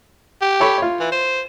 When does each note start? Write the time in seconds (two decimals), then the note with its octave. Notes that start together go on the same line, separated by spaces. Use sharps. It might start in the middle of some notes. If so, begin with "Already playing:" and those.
0.42 G4
0.60 A4 C#5 B5
0.78 F4 C#5
1.00 E3
1.12 C5